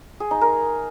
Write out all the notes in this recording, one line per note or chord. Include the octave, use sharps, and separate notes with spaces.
G#4
D#4
A#4